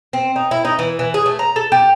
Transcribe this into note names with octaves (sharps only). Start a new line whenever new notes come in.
C4
D#4
E4
D#4
E3
E3
G#4
A3
A#5
A4
G4